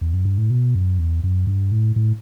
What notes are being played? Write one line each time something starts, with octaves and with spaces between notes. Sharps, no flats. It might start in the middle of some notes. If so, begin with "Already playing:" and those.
E2
F#2
G2
A2
B2
F#2
E2
F#2
G2
A2
A2